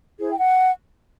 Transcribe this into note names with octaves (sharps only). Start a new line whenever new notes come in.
E4 G#4 C5
G5
F#5